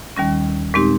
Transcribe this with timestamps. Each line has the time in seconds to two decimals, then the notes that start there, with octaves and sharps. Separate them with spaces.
0.17 D#2 D#3 G3 C#4
0.74 A#2 G#3 C4 D#4 G4